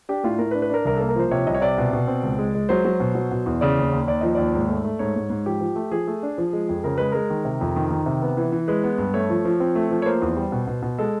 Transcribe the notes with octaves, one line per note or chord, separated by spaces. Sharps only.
D4 G4
A2 F4
A2 A#4
B4
D4
B4
D4 A#4
C2 A#4
A#3 A4
A#4
F3 C5
C3 C#5
C2 D#5
C#5
C3 D5
B2
B2
C4
C#2
G#3
G#3
F#3 C5
F#3
B2
F#3
B2
E2
C#3 D5
D#2
D#2
D#2 D5
F3 D#5
D#2 D5
G#2
A3
A3
G#2 C#5
G#2
G#2
F3 G4
F3
A3
F3 G#4
A3
D4
F3
G#3
F2
C#3 A#4
G#3 B4
G#3 A#4
D#3
C3
F2
D#3
D#3
C3
B3
E3
E3
G#3 B4
B3
G2
A3 C#5
F3
F3
C4
A3
F3
C#5
A#3 C5
E2
G3
B2
B2
B2
G#3 A4